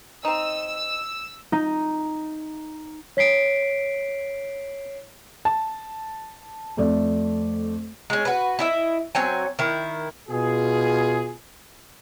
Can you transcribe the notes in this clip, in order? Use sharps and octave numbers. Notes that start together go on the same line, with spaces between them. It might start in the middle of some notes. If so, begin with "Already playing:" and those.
C4 D#4 E6
D#4
C#5 B6 C7 D7
A5
F2 A3 D5
G#3 C#4
F#4 B4
E4 D#5 E5
F#3 C4 C#5 G#5
D#3 E4
B2 F4 G#4